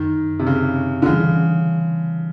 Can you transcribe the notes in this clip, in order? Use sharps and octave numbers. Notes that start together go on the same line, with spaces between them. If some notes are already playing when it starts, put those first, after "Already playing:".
Already playing: F#2 D#3
C3
C#3
D3
C#3 E3 G3